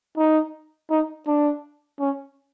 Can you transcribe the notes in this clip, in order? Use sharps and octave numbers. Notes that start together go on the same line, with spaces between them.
D#4
D#4
D4
C#4